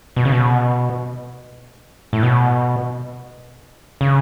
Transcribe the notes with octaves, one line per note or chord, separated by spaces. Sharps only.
B2
C#3
B2
A2
B2
C#3